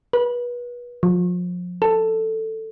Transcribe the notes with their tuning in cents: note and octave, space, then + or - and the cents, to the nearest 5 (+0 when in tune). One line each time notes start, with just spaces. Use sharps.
B4 -30
F3 +35
A4 +10